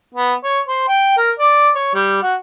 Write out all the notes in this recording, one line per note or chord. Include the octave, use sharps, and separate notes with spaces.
B3
C#5
C5
G5
A#4
D5
C#5
G3
F#4